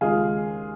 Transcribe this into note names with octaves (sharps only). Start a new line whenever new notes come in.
D#2 C#3 G#3 F4 G#4